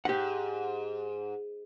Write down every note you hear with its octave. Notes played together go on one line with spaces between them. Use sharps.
G#2 G4 F#5